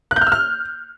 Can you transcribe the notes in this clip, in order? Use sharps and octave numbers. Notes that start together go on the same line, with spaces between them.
F#6
G6
F6
E6
F6